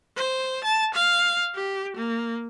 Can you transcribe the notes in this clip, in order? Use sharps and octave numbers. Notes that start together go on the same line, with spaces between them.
C5
A5
F5
G4
A#3